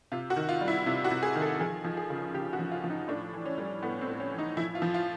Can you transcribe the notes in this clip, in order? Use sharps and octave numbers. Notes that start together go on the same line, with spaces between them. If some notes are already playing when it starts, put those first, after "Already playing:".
C3 F4
F#4
D#3
F4
G3
E4
C3 F4
F#4
C3
G#4
D#3
A4
F3 G#4
F3
G#4
C#3
C#3 G4
F#4
F3
F4
F3
D#4
A2 D4
E3
C#4
G3
A2 B3
C4
A2
C#4
E3
D#4
F3 E4
F4
F3
F4